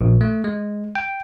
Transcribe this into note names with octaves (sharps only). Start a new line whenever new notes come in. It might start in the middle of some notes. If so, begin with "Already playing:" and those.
A#1
A3
G#3
G5